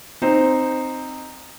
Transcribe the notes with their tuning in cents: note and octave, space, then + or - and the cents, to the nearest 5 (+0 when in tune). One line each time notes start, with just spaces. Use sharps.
C4 +0 D#4 -10 C5 +0